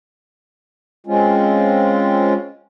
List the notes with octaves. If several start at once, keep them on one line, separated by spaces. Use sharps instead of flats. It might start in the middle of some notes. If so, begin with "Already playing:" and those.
G#3 C4 C#4 F4